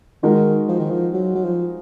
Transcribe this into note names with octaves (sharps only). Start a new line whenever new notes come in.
D#3 G#3 D#4 F#4 A#4
F3
D#3
F3
F#3
F#3
F3